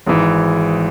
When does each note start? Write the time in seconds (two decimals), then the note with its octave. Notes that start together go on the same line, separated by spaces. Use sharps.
0.07 G#1 G#2 E3